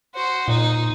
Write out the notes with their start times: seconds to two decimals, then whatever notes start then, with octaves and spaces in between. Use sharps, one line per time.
0.15 F#4 C5
0.48 A#2 D#4